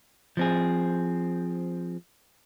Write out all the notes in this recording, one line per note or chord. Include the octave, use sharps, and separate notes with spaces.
F3 C4 G#4